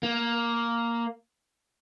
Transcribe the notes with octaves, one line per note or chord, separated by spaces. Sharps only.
A#3